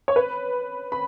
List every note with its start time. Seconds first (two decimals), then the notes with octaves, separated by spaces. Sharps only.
0.08 C#5
0.16 B4
0.92 B5